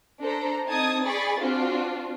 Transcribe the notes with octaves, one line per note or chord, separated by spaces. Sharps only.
D4 A4 C5 A#5
C4 D#4 A5 D#6 G#6
G#4 D5 B5 C#6 A6
C4 D4 F4 F#4